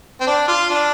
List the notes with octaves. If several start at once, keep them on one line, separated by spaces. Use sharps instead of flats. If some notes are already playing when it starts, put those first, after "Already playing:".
C4
D4
F4
D4